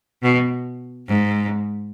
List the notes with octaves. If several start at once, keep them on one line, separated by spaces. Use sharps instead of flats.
B2
G#2